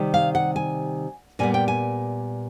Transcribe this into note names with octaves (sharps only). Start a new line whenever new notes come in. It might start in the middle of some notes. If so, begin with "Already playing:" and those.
Already playing: C3 D#3 G3
F5
F#5
G#5
A#2 G3 B3 G#5
G5
G#5